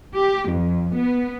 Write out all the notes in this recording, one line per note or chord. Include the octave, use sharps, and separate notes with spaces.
G4
F2
B3